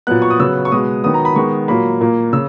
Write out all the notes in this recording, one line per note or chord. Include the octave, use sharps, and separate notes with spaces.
A#2 F#3 B3 F#6
C#6
D#6
C#3 F#3 B3 E6
C#6
B2 G#3 B3 D#6
D#3 F#3 B3 D#6
A#5
B5
D#3 G#3 B3 C#6
A#2 F#3 A#3 B5
A#2 A#3
C#3 E6